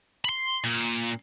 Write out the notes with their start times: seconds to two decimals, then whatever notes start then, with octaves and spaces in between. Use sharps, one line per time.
0.24 B5 C6
0.64 A#2